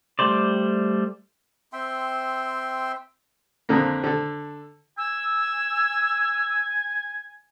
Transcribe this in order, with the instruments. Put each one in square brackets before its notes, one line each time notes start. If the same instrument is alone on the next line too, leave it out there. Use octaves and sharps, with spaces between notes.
[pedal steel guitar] G3 A3 C5 D5
[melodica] C4 E5 G5 C6
[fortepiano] F2 D3 A#3
D3 A4
[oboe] G#5 [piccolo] E6